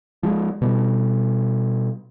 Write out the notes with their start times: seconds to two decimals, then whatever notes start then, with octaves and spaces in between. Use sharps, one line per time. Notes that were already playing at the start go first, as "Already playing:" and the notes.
0.23 F3 G3 G#3
0.62 B2 G3